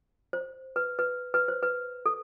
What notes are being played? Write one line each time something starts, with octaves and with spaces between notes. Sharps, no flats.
C5
B4
B4
B4
C5
B4
A4